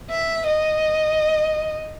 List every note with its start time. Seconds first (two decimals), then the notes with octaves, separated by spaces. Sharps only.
0.11 E5
0.46 D#5